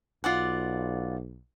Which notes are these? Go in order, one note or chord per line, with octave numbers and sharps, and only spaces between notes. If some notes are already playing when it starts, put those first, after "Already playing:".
B1 F4 D5 F#5